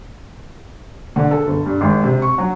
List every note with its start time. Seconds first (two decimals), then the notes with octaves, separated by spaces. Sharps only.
1.16 D3
1.31 A4
1.47 G1
1.66 G2
1.81 G#1
2.03 C3
2.22 C#6
2.38 F#3